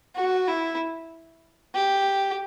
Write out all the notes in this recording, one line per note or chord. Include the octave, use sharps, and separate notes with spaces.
F#4
E4
G4